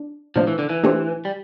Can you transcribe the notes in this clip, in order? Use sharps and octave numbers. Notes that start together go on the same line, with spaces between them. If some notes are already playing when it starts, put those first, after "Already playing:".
Already playing: D4
A#2 F3 A3 D4 F4 C5
E3
D3
E3
A#2 A3 D4 G4 C5
G3